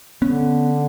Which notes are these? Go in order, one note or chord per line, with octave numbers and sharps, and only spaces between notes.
D3 B3 C#4